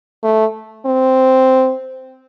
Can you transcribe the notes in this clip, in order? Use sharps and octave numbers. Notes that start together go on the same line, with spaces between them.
A3
C4